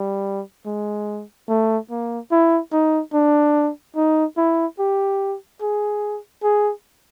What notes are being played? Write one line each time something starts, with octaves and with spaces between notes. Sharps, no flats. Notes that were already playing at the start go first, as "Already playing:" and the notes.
Already playing: G3
G#3
A3
A#3
E4
D#4
D4
D#4
E4
G4
G#4
G#4